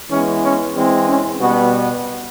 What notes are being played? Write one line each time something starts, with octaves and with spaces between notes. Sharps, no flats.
E3 G#3 B3 C#4
C#4
E3 G#3 C4
C#4
B2 G3 B3 F#4